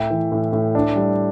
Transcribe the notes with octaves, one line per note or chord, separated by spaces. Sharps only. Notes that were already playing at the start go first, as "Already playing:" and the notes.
Already playing: A2 E5 G5
E3
A2
A2
D4
G3